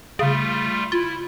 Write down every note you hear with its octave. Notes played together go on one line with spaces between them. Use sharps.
C#3 G3 A3 F4
E4 F4